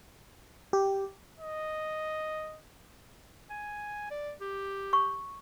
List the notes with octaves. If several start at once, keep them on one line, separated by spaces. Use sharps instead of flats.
G4
D#5
G#5
D5
G4
C#6